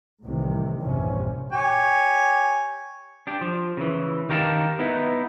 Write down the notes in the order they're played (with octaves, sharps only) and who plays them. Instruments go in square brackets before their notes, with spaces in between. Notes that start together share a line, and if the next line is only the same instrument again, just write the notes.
[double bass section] C2 A2 C3 D#3 E3
A#1 E2 G2 C3 C#4
[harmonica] G4 C#5 G#5
[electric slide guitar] D4 G4
F3
C#3 E3
D#3 G4 A#4 F5 F#5 A5
B3 D#4 E4